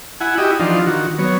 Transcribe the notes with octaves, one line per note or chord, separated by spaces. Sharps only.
E4 F#5 G#5
E4 F#4 G4 D#5
E3 F3 D4 D#4 F4
D#3 F#4
F#3 B3 C#5